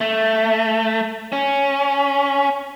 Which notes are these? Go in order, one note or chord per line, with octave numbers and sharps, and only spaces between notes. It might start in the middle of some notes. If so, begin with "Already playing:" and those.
A3
C#4